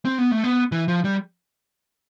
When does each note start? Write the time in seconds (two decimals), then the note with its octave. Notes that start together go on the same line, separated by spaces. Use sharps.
0.05 C4
0.18 B3
0.31 A3
0.44 B3
0.72 E3
0.88 F3
1.05 G3